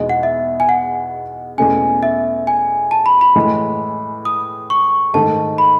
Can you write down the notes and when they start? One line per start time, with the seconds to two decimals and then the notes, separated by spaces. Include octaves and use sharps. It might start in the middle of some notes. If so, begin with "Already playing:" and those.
Already playing: E2 B2 G#3 D#4
0.09 F#5
0.23 E5
0.60 G#5
0.69 F#5
1.58 E2 B2 A3 C#4 G#5
2.03 E5
2.47 G#5
2.91 A5
3.06 B5
3.21 B5
3.36 A2 E3 G#3
4.25 D#6
4.70 C#6
5.13 G#2 D#3 A3 D#4 A5
5.58 B5